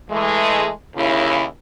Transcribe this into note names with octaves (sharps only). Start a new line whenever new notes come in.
E3 G#3 A3
D#2 C#3 E4